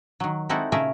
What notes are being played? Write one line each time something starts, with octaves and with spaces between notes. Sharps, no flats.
D#3 F#3
G#3 C4 D#4 E4 F#4 A4
A#2 C#3 A3 G#4 A#4 E5